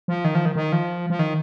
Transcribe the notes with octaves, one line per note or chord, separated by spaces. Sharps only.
F3
D#3
F3
D#3
D#3
F3
F3
D#3